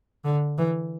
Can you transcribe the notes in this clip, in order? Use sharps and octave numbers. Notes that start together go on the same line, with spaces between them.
D3
E3